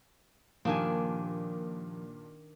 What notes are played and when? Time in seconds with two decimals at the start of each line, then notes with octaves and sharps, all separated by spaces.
0.65 G2 A#2 D#3 F3 A#3 D4 G#5